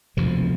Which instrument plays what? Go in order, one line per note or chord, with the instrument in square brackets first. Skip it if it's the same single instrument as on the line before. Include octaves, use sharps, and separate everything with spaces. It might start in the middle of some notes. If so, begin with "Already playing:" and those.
[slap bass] E1 D2 C3 F3